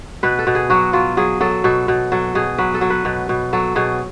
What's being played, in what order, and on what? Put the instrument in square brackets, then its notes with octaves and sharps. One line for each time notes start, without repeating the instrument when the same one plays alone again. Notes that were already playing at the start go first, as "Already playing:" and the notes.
[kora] B2 B4
A4
B2
G#4
F#3 F#4
F#3 F4
F#3 G#4
F#3 A4
B2 A4
B2
F#3 A4
B2 G#4
F#3 B4
A4
F#3
B4
B2
B2
F#3 A4
B2 G#4